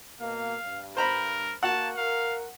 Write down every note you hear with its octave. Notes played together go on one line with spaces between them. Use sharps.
B2 A#3 F5
G2
A#4 C5 A#5 B5
A#3 F#4 F#5 A5
A#4 F5